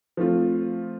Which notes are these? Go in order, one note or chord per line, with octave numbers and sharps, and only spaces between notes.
F3 A3 C4 F4